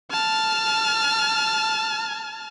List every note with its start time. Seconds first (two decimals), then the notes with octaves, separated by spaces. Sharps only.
0.11 A5 F6